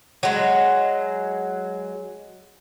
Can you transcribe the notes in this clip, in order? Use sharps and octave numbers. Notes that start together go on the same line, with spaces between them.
F#3 G#3